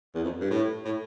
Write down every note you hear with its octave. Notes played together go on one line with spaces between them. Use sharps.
E2
F2
G2
A2
A2